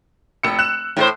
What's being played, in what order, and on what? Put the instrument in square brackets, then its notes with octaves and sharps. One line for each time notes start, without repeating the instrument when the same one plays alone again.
[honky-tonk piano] F1 E6 C#7
F#6 E7
[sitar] A2 A4 C5